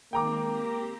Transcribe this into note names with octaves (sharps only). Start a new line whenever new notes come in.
D#3 G#3 A#3 C4 G5 A#5 D6
C4 G4 A#6